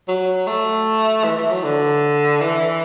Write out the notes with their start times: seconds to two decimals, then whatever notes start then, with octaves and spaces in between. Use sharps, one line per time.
0.08 F#3
0.47 A3
1.25 E3
1.38 E3
1.51 F#3
1.64 D3
2.42 E3